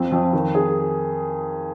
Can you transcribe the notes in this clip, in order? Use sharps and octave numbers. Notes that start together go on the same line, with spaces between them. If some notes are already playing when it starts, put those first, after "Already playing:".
Already playing: F2 C4
F2
D#3
G#4